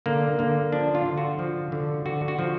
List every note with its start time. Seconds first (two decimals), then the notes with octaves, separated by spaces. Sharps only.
0.06 D3 A#3
0.39 D3 A#3
0.72 F3 D4
0.95 F4
1.06 D3
1.18 F#4
1.39 F3
1.72 D3
2.06 D3 F#4
2.28 F#4
2.39 F3